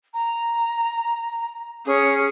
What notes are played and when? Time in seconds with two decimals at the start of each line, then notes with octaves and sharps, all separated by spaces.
0.14 A#5
1.86 C#4 G#4